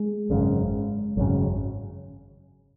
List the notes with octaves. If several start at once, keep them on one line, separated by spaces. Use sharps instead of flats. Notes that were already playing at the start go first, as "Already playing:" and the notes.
Already playing: G#3
G#1 F#2 C#3
G#1 F#2 C#3 F#3